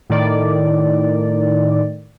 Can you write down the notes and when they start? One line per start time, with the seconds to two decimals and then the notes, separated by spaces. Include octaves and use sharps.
0.10 A2 D#3 D5